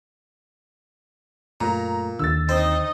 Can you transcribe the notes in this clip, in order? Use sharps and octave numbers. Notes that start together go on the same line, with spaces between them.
F#2 A#2 A3 A#5
D#2 D3 E6 A6
C4 D#4 C5 D#5